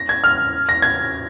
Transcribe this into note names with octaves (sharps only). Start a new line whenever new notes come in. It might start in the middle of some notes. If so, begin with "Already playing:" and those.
Already playing: A#6
G#6
F6
A#6
G#6